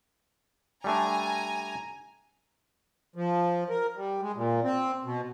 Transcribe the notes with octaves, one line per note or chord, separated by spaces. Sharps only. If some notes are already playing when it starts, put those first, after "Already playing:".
G3 A3 D4 G#5 A#5
F3
A#4
G3
G#3
A#2
C4
B2